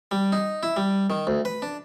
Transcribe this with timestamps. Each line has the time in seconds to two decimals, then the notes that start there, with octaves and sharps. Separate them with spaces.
0.11 G3
0.32 D#4
0.63 E4
0.76 G3
1.10 D#3
1.27 D2
1.45 B4
1.62 D4